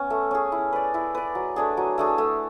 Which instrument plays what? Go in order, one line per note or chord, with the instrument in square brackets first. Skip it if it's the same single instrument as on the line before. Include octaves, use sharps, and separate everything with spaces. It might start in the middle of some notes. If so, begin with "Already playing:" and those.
Already playing: [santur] B3 C#4
A3
C#4 G#4
E4
B4 D5
E4
B4 D5
F#3
A3 D4 G#4
F#3
A3 D4 G#4
A3